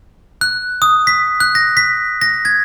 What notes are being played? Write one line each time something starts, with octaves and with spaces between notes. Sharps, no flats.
F#6
D#6
B6
F#6
A#6
B6
A#6
G#6